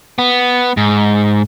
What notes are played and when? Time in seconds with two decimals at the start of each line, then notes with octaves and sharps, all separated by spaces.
0.19 B3
0.77 G#2